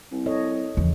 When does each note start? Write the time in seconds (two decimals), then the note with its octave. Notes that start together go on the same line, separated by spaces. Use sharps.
0.12 C2
0.26 A4 C#5 D#5
0.77 E2 C#3 E3 F3